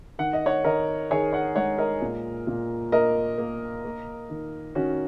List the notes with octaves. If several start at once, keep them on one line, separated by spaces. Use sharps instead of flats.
D#3 F#5
D#5
C#5 F#5
D#3 A#4 D#5
D#3 G#4 C#5
C#5 F#5
G#3 C#5 F#5
A#4 D#5
A#2
A#2
A#3 A#4 D#5
A#3
A#3
D#3
D#3 C#4 F#4